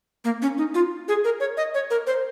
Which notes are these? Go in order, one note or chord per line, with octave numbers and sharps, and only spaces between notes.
A#3
C#4
D#4
F4
G#4
A#4
C#5
D#5
C#5
A#4
C5